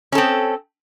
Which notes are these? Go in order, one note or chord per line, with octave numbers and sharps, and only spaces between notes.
C4 C#4 A4